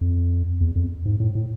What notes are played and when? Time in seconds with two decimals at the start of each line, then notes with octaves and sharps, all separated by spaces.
0.01 F2
0.61 E2
0.76 F2
1.06 G#2
1.20 A2
1.35 A2